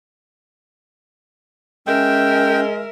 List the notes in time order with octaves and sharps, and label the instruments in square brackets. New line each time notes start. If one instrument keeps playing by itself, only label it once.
[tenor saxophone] G#3 [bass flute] C#4 [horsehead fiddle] A#4 E5 [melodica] G5